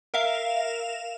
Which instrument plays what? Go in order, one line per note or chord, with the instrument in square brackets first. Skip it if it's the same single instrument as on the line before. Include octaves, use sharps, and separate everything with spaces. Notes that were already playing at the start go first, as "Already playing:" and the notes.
[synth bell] A#4 E5 F5